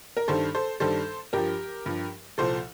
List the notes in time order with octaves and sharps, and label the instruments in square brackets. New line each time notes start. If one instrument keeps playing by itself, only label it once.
[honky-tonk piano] A#4
G2 D#3 G3 A4 C5
A4 C5
G2 D#3 G3 A4 C5
G2 F3 G4 A#4
G2 F3
C2 A#2 F3 A4 C5